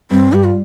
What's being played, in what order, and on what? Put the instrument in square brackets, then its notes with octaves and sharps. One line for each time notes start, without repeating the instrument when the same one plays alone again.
[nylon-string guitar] G2 [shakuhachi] C4
[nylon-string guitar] G2 [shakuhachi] G4
[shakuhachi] F4